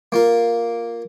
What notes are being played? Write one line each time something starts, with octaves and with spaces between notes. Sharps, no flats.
A#3 F4 A#4